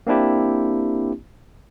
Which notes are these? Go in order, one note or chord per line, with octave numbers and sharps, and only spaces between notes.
A#3 C4 D4 E4 G4